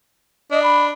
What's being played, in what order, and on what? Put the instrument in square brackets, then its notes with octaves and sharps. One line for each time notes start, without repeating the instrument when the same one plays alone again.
[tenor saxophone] D4 [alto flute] D#5
[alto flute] B5